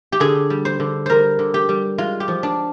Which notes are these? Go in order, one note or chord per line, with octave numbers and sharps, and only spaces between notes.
G4
D3 G#4
G3
C5
D3
G3 A#4 C5
D3
G4
G3
G#3 F4
G4
F3
D4